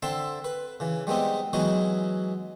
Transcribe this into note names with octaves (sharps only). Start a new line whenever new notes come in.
D3 C4 A4 E5 A5 C6
B4
C#3 E3
G3 G#3 B3 C4 D#4
E3 F#3 G#3 B3 D#4 F#4